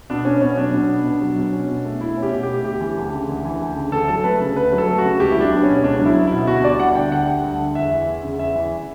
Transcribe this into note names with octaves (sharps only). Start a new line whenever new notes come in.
B2 D4
B3 C#4
B2 C#4
F#3 D4
B2
B3
B2
F#3
B2
C#4
B2
A3
B2 E4
C#4
G4
B2
A3 G4
D2 G4
E3
D2
C#3
D2
E3
D2
C#3
D2 A4
F#3 A4
A3 B4
C#3
D2 B4
F#3
A4
A3
F#4
C#3
C#2 G4
E4
F#3 D4
B3
C#4
B2
C#2 D4
F#3
E4
B3
B2 E4
D2 F#4
G3 D5
D2 F#5
D3 G5
D2 F#5
G3
D2
D3
E2 E5
E3
E2
C#3
E2 E5
E3